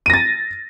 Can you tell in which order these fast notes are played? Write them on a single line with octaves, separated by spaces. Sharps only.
D#7 A#6 A6